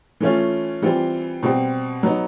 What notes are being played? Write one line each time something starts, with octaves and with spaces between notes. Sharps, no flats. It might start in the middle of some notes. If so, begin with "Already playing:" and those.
E3 A3 C#4 F4
E3 G3 C4 F4
B2 G3 C4
F#3 B3 D#4